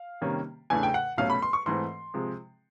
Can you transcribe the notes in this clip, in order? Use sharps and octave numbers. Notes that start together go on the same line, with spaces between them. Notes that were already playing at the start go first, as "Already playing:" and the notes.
Already playing: F5
C3 D#3 G3 A#3 C#4
E2 C#3 E3 A3 D4 G#5
G5
F#5
C2 B2 F#3 A3 C#4 F5
B5
C6
C#6
G#2 E3 A3 C4 C6
C3 F3 G#3